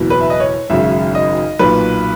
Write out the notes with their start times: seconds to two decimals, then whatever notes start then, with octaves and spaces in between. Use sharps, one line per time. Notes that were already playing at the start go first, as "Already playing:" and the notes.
Already playing: F#1 E2 B2
0.10 B4
0.20 E5
0.30 D#5
0.40 C#5
0.70 G#1 F#2 C#3 E5
1.15 D#5
1.59 B1 A#2 B4